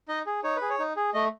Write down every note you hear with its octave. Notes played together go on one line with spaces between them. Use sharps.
D#4 D#5
G#4
D#4 C#5
B4
G#4
C#5
D#4
G#4
A3 D#5